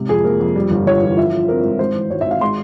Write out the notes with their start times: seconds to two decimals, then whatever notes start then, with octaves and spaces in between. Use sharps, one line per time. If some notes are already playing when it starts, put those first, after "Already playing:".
Already playing: G#2 C3
0.09 F2 G#4
0.24 A#3 A#4
0.40 F2
0.56 G3
0.71 G1
0.86 G1 C#5
1.02 E3
1.17 F3 E5
1.32 F3
1.48 C4 A#4
1.64 G#2
1.79 G#1 C5
1.95 E3
2.10 G#1 C#5
2.21 E5
2.26 G#1 F5
2.41 G#3 C6